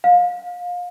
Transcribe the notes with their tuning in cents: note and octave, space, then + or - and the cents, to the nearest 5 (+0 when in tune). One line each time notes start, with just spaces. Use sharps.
F5 +30